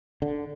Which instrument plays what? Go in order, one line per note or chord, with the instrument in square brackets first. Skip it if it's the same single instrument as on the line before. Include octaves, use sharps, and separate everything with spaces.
[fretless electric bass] D3